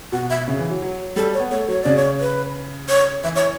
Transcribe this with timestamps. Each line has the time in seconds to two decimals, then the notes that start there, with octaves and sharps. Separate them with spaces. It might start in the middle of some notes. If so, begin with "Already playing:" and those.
0.12 B2 F#5
0.30 E5
0.48 C#3
0.59 E3
0.70 F#3
0.82 F#3
1.16 G3 A4
1.34 C#5
1.39 B3
1.51 A3 C#5
1.68 F#3 C#5
1.82 C#3 D5
1.96 C#5
2.20 B4
2.89 C#5
3.24 E3 E5
3.36 C#5